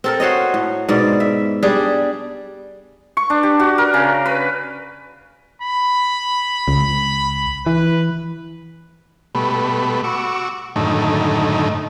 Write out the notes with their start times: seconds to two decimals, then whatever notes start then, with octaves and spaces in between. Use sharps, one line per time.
0.04 C4 A4 A#4
0.20 F#4 C5 C#5 D#5
0.54 A2
0.89 G#2 B2 D5
1.20 E5
1.63 G3 D4 G#4
3.17 C#6
3.30 D4
3.43 G4
3.60 F#4
3.78 A#4
3.94 C#3
4.26 B4
5.62 B5
6.68 C#2
7.66 E3 B4
9.35 B2 G3 A3 B4
10.04 F#4 C#6 D6 E6
10.76 F#2 A2 D3 D#3 A3 D#4